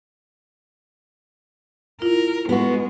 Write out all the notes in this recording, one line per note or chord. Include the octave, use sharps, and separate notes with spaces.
E4 F4 A#4
G#3 B3 F#4 B4